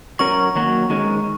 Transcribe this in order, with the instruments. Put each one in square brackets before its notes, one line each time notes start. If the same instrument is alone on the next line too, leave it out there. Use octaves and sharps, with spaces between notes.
[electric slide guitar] F#3 C#4 A#4 [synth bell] C#6
[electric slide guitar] D#3 F#3 A#3 F#4
D#3 G#3 C#4